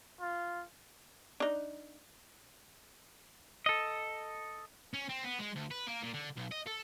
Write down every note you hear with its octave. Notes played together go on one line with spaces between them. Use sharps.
F4
D4 D#4
A4 D#5
C#4
C4
B3
G#3
D2
B4
A#3
A#2
D3
B1
D#5
A4